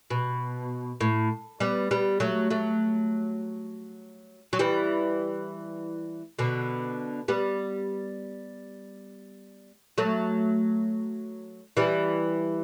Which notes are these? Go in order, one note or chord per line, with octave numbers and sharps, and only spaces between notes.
B2
A2
G3 B3
G3 B3
F#3 A3
F#3 A3
F#3
E3 G3
B2 D3
G3 B3
F#3 A3
E3 G3